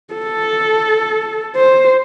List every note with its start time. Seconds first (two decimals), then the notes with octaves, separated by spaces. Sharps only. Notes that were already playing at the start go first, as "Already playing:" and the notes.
0.14 A4
1.56 C5